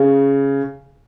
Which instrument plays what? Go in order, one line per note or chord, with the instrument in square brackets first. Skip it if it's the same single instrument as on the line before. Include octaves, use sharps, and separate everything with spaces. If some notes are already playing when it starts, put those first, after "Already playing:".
Already playing: [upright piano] C#3